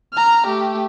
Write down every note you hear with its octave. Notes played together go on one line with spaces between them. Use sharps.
A#5 F6
A3 G4